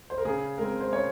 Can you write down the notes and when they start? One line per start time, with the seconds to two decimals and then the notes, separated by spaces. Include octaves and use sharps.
0.10 C5
0.18 A#4
0.25 C#3 G#4
0.58 G#3 C4 A#4
0.81 C5
0.92 C#3 C#5